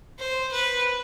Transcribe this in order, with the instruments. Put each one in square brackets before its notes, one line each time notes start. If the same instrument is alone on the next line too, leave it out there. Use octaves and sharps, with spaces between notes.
[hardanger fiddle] C5
B4